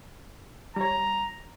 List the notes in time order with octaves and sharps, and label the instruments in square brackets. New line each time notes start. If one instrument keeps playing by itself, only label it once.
[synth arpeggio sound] G3 C#5 [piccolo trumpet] A#5